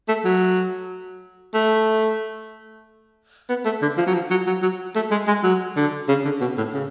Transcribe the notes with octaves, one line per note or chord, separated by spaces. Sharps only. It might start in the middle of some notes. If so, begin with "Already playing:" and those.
A3
F#3
A3
B3
A3
D3
F3
F#3
F3
F#3
F#3
F#3
A3
G#3
G#3
F#3
D3
C#3
D3
B2
A2
C#3